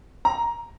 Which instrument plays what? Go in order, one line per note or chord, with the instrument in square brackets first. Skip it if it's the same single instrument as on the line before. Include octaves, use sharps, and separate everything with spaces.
[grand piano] A#5